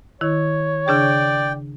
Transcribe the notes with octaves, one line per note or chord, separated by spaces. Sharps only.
D#3 E4 C#5
C#3 D4 G#4 D5 G5